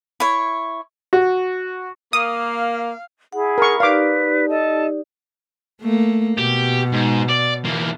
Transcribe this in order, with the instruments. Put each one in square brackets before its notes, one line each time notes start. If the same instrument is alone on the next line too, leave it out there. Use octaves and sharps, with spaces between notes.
[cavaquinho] E4 C#5
[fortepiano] F#4
[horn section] A#3 [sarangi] F5 [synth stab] D#6
[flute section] E4 G#4 [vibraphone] F#5
[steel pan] A#4 C#6
[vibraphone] D#4 G4 D5 [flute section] B4 [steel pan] F5 D6
[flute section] A4 D#5 A5
[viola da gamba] A3 A#3
[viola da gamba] B2 [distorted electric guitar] G4
[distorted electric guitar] G#2
D5
E2 A#3